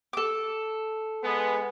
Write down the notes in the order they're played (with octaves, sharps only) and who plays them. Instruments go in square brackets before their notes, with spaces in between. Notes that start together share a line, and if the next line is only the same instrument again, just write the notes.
[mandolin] A4 D6
[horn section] G#3 B3